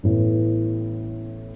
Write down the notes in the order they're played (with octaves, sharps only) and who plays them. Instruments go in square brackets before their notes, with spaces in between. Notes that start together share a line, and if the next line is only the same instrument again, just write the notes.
[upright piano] A1 A2 E3 B3